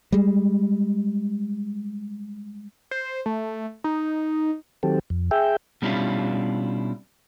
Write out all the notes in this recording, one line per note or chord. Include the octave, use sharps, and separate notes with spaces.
G3 G#3
C5
A3
D#4
D#3 F#3 C4 G4 A4
F2
G#4 E5 G5
B2 G3 C#4 D4 E4 F4